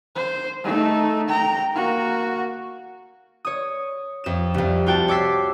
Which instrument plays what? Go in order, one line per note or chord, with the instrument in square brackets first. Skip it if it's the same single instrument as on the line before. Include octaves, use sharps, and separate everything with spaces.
[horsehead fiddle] C5
A3 D#4
G5 A#5
A#3 F#4
[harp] C#5 D#6
F2 E7
C2 F2
F4 F#4 G5 A5
C#5 D6 E6 B6 C7